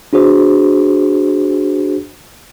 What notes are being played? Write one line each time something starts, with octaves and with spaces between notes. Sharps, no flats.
D4 F#4 G#4 C5